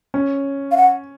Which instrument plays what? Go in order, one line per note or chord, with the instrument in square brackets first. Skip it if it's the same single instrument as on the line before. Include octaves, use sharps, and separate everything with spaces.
[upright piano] C#4
[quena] F5
F#5